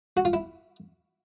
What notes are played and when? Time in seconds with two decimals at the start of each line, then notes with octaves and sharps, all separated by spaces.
0.17 F#4
0.25 F4
0.33 E4